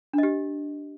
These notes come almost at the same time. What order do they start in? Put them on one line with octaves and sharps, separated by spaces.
D4 D#5 G4